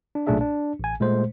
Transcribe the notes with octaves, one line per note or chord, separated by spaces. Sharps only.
D4
B1 A#2 A3 D4 G#4 E5
D4
A1 G#5
A#2 G#3 A3 C5